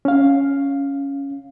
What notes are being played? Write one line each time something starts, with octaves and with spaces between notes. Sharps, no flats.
C#4 F5